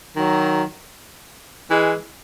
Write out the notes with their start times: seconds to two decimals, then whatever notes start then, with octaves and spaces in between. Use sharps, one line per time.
0.16 D#3 F#3
1.70 E3 G#3